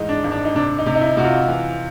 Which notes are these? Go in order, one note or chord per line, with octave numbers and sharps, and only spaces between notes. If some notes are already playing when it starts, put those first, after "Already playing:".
Already playing: G#2 D#3 E3 D#4
D4
G#1
D4
D#4
C3 D4
D#4
C3
D#4
E4
C3 F#4
F4
E3